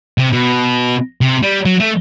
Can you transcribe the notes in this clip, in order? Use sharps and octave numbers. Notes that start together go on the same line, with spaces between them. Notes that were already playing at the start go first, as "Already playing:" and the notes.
C3
B2
C3
G3
F#3
A3